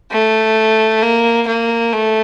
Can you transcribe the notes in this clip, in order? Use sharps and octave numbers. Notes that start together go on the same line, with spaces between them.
A3
A#3
A#3
A3